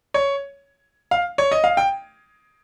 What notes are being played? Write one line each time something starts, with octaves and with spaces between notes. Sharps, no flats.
C#5
F5
C#5
D#5
F5
G5